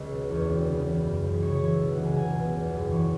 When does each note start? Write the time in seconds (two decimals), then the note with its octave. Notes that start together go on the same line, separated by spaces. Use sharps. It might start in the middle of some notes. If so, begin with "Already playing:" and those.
Already playing: C#2 C#5
0.12 B2
0.30 E2 C#5
0.49 E1
0.68 C#3
0.86 E3
1.05 F#2
1.24 F#1
1.42 C#3 C#5
1.55 C#5
1.61 E3
1.68 E5
1.80 B2
1.92 F#5
1.98 C#2
2.04 G#5
2.16 C#2 G#5
2.35 B2
2.55 E2
2.73 F#1
2.91 E3 C#6